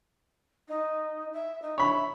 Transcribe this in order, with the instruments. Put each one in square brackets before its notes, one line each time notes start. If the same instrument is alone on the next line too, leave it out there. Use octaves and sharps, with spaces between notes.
[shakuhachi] D#4
E5
D#4
[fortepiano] C#5 B5 [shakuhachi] E5